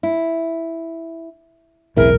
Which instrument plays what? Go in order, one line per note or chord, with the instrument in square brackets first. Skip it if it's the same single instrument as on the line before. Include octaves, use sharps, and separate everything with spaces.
[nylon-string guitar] E4
[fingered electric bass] B1 E2 A2 [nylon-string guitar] C4 E4 G#4 [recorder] A#4